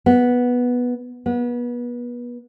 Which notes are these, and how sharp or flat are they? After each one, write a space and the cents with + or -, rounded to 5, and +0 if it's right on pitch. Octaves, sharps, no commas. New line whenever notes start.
B3 -5
B3 -30